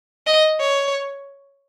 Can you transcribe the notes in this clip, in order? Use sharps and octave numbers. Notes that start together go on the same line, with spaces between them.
D#5
C#5